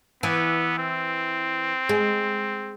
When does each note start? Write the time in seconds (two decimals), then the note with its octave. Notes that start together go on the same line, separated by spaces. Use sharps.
0.23 E3 B3
0.78 C4
1.89 G#3